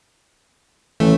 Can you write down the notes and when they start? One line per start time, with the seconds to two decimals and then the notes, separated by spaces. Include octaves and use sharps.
1.00 A1 E3 A3